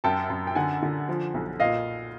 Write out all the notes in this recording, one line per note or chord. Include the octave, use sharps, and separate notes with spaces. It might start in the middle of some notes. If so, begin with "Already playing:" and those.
F#2 G5 A5
F#2
G5
D3 F#5 G#5
D3
F3
B1
A#2 D#5 F5